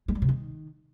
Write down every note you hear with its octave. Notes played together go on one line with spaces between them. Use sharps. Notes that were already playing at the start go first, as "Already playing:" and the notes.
G#3
G3
C3
D#3